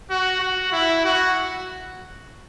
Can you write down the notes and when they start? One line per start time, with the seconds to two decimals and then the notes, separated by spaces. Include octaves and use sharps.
0.10 F#4
0.41 F#4
0.72 E4
1.04 F#4